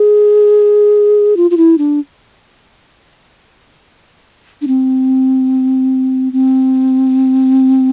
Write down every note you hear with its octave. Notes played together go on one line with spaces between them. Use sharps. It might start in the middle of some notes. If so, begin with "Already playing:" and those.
Already playing: G#4
F4
F4
E4
D4
D4
C4
C4